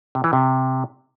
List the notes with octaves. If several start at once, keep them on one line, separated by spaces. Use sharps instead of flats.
C3
E3
C3